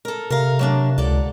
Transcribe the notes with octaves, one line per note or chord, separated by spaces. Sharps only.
A4 A#4
C3 A#4 F5
F#3 A#3 D4
C#2 D3 A4 D5